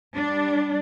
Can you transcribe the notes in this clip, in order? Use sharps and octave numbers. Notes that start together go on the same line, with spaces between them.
G3 D4